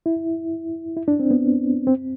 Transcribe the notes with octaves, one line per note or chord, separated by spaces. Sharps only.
E4
E4
D4
C4
B3
C4